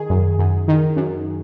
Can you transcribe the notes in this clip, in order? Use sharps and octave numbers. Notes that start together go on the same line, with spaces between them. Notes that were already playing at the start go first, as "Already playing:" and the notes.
Already playing: D#3 G#4
F#2
F#2
D#3
F#2